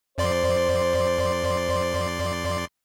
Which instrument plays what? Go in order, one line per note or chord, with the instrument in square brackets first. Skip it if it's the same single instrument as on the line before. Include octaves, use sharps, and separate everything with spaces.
[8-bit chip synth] F2 D5 C6 [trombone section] C5